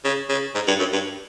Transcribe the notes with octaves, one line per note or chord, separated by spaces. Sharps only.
C#3
C#3
G#2
G2
F#2
G2